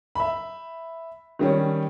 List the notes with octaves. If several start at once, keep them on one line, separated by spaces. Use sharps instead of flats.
E5 B5
D#3 G3 C#4